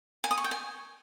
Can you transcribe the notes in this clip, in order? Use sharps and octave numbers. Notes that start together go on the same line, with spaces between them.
G#5
D#6
C#6
G5
G#5